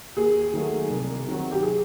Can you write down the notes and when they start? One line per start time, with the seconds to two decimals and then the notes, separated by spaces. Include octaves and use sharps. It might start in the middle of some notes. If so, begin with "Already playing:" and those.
0.17 D#2 G#4
0.53 D#3 F#3 A3
0.90 C2
1.26 C3 D#3 F#3
1.52 G4
1.63 G#4